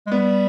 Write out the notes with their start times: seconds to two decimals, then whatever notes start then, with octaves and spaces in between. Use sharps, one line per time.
0.07 G#3
0.11 G3 B3